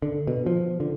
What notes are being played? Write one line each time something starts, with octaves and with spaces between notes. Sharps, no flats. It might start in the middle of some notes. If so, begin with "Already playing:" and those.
D3
B2
F3
D3